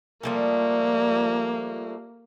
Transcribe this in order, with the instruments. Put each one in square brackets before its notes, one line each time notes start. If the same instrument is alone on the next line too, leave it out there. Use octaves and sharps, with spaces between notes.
[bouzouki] F3 G3 A3 [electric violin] A#3